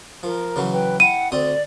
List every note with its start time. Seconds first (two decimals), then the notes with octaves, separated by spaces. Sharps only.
0.23 F3 A#4
0.56 C#3 E3 F#3
0.72 B4 G5
1.00 E4 F#5 G5 D#7
1.32 D2 C4 D5 D#6